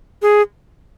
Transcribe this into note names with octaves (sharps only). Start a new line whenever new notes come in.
G#4